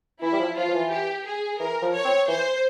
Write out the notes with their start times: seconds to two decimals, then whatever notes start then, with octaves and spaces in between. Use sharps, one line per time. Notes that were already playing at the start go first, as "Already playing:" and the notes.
0.22 E3 E4
0.32 G3
0.39 F3
0.56 F3 F4
0.69 F3
0.74 E3
0.91 G4
1.25 G#4
1.59 E3 A#4
1.82 F3
1.94 C#5
2.05 C4
2.28 E3 C5